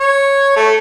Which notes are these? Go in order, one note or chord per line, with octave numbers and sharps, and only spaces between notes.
C#5
A3